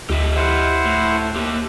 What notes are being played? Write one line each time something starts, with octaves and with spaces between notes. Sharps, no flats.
D2 G4 D#5 E5
E4 C5 F#5
A2
A#3 G4